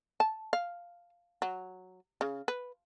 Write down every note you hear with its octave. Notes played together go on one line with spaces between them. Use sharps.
A5
F5
F#3
C#3
B4